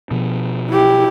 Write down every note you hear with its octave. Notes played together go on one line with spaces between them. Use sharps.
B2 F3
E4 G4